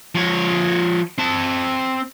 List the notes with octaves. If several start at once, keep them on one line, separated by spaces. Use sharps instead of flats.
F3 C#5
C4 A5